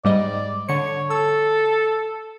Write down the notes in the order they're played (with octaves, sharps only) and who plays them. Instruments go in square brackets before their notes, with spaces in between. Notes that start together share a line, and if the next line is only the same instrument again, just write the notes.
[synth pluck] G#2 G3 D#5 [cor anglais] D5
[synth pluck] D3 C#7 [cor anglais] C#5
[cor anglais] A4 [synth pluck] E6